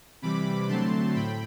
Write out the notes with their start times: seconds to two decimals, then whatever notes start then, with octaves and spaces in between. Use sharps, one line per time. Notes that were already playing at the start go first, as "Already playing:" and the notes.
0.22 C3 E3 G3 B5 D6
0.68 D3 F#3 A3 C4 A5 C6
1.15 A2 G5 B5